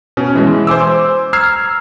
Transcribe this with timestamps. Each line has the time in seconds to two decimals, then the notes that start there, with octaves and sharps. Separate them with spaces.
0.17 B2 C#4
0.35 E3 G#3
0.67 C5 G#5 D6 E6
1.33 A#5 E6 F6 G#6 C7